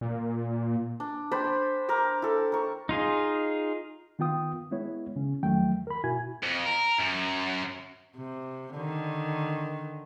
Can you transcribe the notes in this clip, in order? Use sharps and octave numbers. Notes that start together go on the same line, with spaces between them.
A#2
D4
D4 C5 G5 B5
A#4 G5 D6
E4 A4
A#4 C#6
D#4 F4 G#4
D#3 B3 F4 G5 D#6
G#3 B3 E4 C#5
C#3 C#4
E2 D#3 F3 F#3 A3 G5
A#4 B5
B2 E4 F#4 G#5 G#6
F2
A#4
F#2
C3
D3 D#3